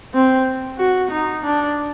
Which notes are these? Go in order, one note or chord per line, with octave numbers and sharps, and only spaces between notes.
C4
F#4
D#4
D4